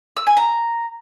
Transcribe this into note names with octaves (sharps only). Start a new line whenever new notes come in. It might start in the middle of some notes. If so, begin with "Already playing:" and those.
E6
G#5
A#5